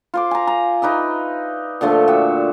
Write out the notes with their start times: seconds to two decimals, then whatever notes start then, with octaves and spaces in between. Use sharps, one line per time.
0.14 F4 C5 D6
0.31 G#5 A#5
0.47 A#5
0.82 D#4 B4 D5 E5
1.81 A#2 D3 F3 A3
2.08 F#4 G4 E5